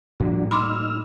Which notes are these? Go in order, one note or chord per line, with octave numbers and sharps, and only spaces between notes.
A2 F3 G3 A#3 D4 F#4
D#4 B5 C6 D6 E6 F6